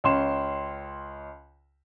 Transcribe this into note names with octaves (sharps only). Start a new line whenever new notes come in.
C#2 C#4 C6 E7